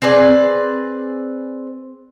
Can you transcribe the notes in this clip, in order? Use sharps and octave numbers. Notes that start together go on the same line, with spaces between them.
C4 G#4 B4 D5